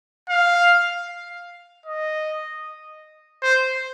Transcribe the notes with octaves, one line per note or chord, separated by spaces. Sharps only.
F5
D#5
C5